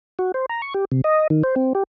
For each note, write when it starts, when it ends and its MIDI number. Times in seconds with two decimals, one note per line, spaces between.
0.19 0.32 66
0.34 0.46 72
0.49 0.61 82
0.62 0.74 85
0.74 0.85 67
0.92 1.01 48
1.04 1.27 75
1.30 1.43 51
1.44 1.55 72
1.56 1.73 60
1.75 1.83 67